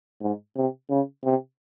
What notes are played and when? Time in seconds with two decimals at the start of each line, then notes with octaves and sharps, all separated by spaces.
0.22 G#2
0.56 C3
0.90 C#3
1.24 C3